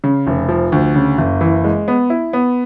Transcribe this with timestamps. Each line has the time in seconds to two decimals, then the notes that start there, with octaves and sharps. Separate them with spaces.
0.04 C#3
0.27 F1
0.49 F3
0.72 D2
0.96 C#3
1.18 F#1
1.41 E3
1.64 G#3
1.88 B3
2.10 E4
2.33 B3